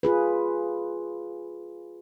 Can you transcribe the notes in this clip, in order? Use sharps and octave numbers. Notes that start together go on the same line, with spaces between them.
F4 G#4 B4